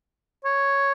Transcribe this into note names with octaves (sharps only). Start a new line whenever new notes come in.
C#5